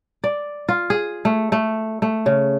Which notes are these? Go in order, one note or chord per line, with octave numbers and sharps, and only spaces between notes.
D5
F4
G#4
A3
A3
A3
C#3